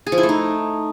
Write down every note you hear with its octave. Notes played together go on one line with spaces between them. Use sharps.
G#4
F3
E4
A3
D#4